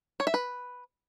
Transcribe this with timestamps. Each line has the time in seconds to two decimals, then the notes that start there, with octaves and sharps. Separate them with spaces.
0.20 C#5
0.27 E5
0.34 B4